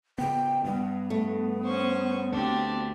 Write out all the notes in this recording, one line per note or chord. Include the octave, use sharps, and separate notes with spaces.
C#3 B3 G5
G2 G3 B3
A3
C#4 C5 C#6
D2 C4 D4 G4